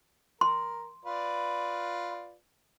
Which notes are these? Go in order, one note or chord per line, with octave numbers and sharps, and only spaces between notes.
A#4 C6
F4 B4 D5